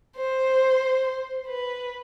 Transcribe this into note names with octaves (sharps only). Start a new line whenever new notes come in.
C5
B4